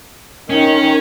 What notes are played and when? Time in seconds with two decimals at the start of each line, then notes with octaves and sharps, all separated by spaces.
0.50 D#3 C#4